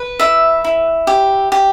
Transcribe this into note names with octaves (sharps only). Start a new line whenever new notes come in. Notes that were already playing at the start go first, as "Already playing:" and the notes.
Already playing: B4
E4 E5
E4
G4
G4